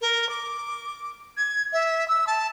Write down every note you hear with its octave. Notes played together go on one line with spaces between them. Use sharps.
A#4
D6
G#6
E5
E6
A5